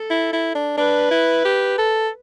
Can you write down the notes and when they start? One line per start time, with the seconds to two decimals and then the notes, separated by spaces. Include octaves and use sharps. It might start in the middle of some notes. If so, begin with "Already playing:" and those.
Already playing: A4
0.10 E4
0.33 E4
0.55 D4
0.77 D4 B4
1.11 E4
1.45 G4
1.78 A4